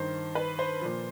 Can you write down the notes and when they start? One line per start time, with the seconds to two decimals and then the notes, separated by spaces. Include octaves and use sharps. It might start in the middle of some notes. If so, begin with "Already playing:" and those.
Already playing: G2 D#3 C5
0.35 B4
0.59 C5
0.81 A#2 F3